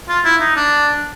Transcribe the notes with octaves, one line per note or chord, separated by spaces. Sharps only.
F4
E4
D#4
D4